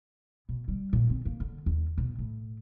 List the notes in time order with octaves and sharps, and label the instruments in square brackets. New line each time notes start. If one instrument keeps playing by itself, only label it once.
[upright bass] B2
G3
A#2
C4
A#3
D3
D#2
B2
A2